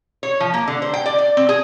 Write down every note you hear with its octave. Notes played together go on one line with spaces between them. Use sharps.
C#5
F3
A#3
D3
C5
G5
D5
D5
C4
G#4